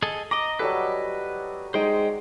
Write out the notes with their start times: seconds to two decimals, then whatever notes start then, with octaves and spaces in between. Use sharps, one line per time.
0.02 G#4 A4 D#5
0.31 D#5 A#5 D6
0.59 F#3 G3 G4 A4 B4 D#5
1.74 G#3 D#4 C5 G5